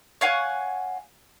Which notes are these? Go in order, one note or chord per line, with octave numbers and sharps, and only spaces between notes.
C#5 F5 F#5 G#5